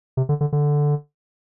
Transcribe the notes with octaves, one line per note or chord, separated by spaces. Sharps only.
C3
D3
D3
D3